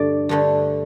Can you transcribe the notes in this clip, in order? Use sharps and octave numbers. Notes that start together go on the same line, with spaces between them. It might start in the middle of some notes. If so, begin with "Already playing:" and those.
Already playing: G2 D3 A3 D5
G2 D3 A3